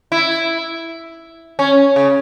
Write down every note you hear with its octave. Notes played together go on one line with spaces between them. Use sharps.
E4
C#4
C#3